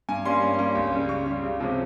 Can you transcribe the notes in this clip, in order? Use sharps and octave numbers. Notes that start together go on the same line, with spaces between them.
G2 G#5
G3 A#3 C#4 C6
G2
G3 A#3 C#4
C#2
C#3 G3
C#2 C#6
C#3 G3
C#2
C3 F3 G#3 C#4